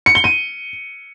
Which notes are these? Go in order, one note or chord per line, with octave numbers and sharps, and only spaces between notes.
C#7
G7
D#7